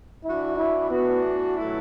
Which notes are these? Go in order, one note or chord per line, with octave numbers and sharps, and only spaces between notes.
E3 D4 E4 F#4
E4
A2 E3 B3 D4 F#4
B2 F#3 A3 E4